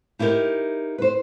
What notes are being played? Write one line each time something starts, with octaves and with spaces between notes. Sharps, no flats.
D#4 E4 G4 G#4 A#4
B4 C5